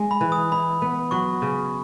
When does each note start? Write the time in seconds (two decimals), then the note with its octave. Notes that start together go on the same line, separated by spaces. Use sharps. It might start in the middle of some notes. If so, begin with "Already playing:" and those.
Already playing: G#3
0.11 B5
0.21 E3
0.32 D#6
0.52 E4 B5
0.82 B3
1.11 F#3 C#6
1.42 C#3